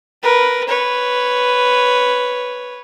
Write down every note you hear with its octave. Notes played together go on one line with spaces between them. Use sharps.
A#4 B4
B4 C#5